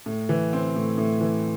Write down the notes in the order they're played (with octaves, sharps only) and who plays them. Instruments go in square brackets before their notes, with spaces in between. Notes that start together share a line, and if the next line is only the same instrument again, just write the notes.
[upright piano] A2
E3
C4
A2
A2
E3